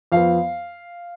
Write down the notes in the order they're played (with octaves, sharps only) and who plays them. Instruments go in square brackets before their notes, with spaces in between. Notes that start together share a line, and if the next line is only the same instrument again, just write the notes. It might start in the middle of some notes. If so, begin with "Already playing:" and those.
[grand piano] F2 F3 B3 F5